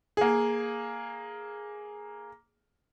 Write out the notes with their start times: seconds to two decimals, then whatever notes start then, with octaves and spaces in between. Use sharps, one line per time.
0.17 A#3 G#4